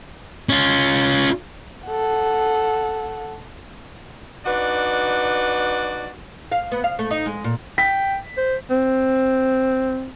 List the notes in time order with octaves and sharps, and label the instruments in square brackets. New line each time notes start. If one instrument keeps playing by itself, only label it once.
[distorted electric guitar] C#4 F4
[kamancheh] A4 F#5
[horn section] D4 D#4 F#4 B4 D5
[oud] F5
B3
F5
A3
D#4
G#3
A#2
[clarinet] G5 [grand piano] B6
[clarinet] C5
[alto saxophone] C4